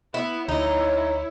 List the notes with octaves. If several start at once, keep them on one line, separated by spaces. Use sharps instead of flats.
B3 E4
D2 D#4 E4 C#5